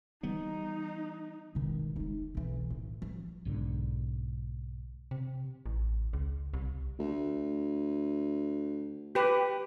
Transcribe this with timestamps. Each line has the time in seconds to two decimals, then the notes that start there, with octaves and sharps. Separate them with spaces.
0.23 E3 G3 B3 D#4
1.55 E1 D#3
1.96 G#3 D#4
2.35 B1 E3
2.70 A2
3.02 F3
3.45 B1 G#2 D3
5.11 C3
5.66 A1
6.13 C#2
6.54 C2
6.99 D2
9.15 G4 B4